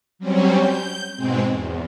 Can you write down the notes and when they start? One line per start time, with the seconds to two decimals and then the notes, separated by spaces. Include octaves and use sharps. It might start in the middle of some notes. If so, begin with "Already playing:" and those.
0.19 F#3 G3 C4 C#4
0.59 G6
1.16 G#2 B2 G#3 C4
1.49 E2